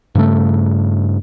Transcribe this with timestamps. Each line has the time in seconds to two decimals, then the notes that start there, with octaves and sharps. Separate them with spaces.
0.15 G2 C#3 A3